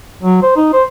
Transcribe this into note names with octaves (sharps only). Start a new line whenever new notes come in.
F#3
C5
D#4
C5